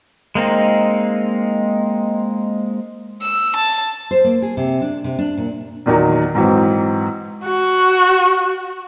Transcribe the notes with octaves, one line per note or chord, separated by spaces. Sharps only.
G#3 A#3 C4 D#4
E6
A5
C5
A#3
G#4
C3
D4
C3
D4
A#2
E2 A#2 D#3 F#3 A#3
G#2 E3 F#3 C4
F#4